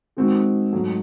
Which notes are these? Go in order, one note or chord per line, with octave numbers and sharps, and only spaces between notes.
D#3 G#3 C4 F#4
G#2 F#3 A3